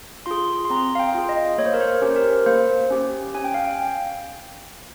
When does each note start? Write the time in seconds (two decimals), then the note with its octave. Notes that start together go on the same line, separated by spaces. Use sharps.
0.26 F4 G#4 C6
0.65 C6
0.70 C4 A#5
0.95 F5
0.99 G5
1.15 F4 G#4
1.29 D#5
1.58 A#3 C#5
1.66 C5
1.74 A#4
1.81 C5
2.02 C#4 G4 A#4
2.10 C5
2.16 A#4
2.46 A#3 C5
2.90 C#4 G4
3.34 C#4 G#5
3.44 G5
3.54 F5
3.65 G5